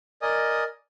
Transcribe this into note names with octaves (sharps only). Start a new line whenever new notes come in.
A#4 D5 D#5 G#5 D#6